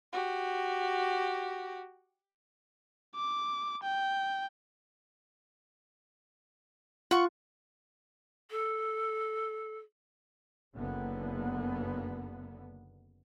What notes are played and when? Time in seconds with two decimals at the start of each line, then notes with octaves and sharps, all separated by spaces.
0.13 F#4 G4
3.15 D6
3.83 G5
7.11 F4 F#5 C#6
8.51 A4
10.74 F#1 D3 A#3 B3